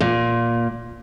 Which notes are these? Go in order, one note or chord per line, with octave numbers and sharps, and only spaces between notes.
A#2